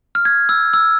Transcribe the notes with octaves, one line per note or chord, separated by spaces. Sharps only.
F6
G#6
E6
E6